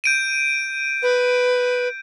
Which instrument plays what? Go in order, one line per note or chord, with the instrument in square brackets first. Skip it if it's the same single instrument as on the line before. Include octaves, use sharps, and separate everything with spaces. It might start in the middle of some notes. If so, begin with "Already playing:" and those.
[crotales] G6 D7 D#7
[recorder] B4